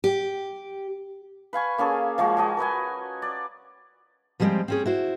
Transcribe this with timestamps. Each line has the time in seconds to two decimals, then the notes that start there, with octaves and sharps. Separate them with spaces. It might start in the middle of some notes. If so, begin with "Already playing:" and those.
0.04 G4
1.53 B4 F5 G#5 C#6
1.78 A#3 C#4 G#4 A4
2.18 F3 G#3 A#3 F#4
2.37 F#4 C#5 D#5 A5
2.57 A#4 B4 D#5 G#5
3.22 D5
4.40 F3 G3 G#3 A#3 C4
4.68 C4 C#4 G#4
4.86 E4 F#4 C5